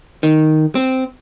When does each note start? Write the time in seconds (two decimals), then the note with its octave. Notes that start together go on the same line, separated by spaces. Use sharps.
0.23 D#3
0.75 C4